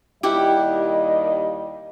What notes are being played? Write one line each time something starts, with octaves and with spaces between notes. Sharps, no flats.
D#2 G3 E4 G4 D#5 F#5